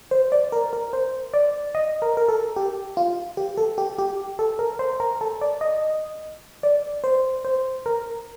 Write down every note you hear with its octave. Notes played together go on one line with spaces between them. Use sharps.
C5
D5
A#4
A#4
C5
D5
D#5
A#4
A#4
A4
G4
F4
G4
A4
G4
G4
A4
A#4
C5
A#4
A4
D5
D#5
D5
C5
C5
A#4